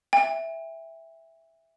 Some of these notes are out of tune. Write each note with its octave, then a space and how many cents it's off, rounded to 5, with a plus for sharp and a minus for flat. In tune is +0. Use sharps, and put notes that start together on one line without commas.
E5 +0 G5 +40